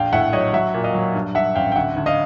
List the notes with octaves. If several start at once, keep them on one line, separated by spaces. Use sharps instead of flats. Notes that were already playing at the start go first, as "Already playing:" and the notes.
Already playing: A#1 F5 G5
A2 E5 F#5
F#3 C#5 D#5
F#3 E5 F#5
A#2
D#5 F5
F#3
G2
G2 E5 F#5
A1 F5 G5
G5
D2 E5 F#5
D2
D#5 F5